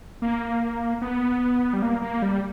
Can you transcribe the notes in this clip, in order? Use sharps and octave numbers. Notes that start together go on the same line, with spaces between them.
A#3
B3
G3
A#3
A#3
G3